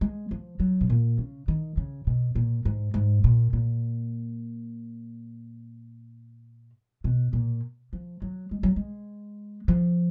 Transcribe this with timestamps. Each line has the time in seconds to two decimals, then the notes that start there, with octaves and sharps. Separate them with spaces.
0.01 G#3
0.31 F3
0.60 F#3
0.81 B2
0.90 A#2
1.18 C#3
1.48 D#3
1.77 C#3
2.07 B2
2.35 A#2
2.65 G#2
2.94 G#2
3.24 A#2
3.53 A#2
7.04 B2
7.33 A#2
7.93 F3
8.22 F#3
8.51 G#3
8.63 F#3
8.76 G#3
9.68 F3